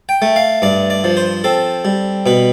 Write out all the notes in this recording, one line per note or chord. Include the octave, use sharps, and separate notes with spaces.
G5
A3
F5
G2 D5
D5
F3
C5
C4 A4
G3
B2 B4